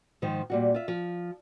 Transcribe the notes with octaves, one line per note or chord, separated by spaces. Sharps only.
G#2 D#3 F3
A#2 G3 F#4
F4 E5
F3